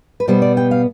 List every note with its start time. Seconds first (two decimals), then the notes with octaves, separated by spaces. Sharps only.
0.20 B4
0.28 B2 G3 B3 C5
0.42 D5
0.57 G5
0.71 F5